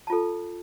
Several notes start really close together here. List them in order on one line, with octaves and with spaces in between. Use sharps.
A5 F4 A4